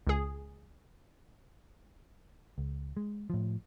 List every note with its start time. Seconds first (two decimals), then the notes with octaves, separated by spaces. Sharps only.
0.07 C#2 G#4
2.58 C#2
2.97 G#3
3.30 A2 F3